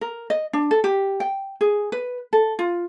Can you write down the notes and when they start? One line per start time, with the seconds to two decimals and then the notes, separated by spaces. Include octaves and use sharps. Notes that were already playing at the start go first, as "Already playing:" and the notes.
0.01 A#4
0.30 D#5
0.53 D4
0.71 A4
0.84 G4
1.20 G5
1.61 G#4
1.92 B4
2.33 A4
2.59 F4